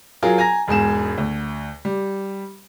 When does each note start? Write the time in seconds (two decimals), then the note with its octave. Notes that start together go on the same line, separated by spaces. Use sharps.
0.23 F#3 F4 G#4 A#4
0.38 G#5 A#5 A#6
0.68 E1 G#2 G#4 E7
1.18 D2
1.85 G3